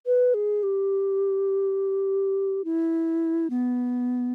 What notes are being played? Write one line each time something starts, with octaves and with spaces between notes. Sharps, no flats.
B4
G#4
G4
E4
B3